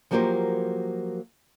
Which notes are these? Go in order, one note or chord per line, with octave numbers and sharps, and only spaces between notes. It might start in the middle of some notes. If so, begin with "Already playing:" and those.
F3 F#3 A#3 G4 A#4 C5